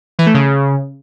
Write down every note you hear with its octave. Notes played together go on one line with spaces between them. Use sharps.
E3
A3
C#3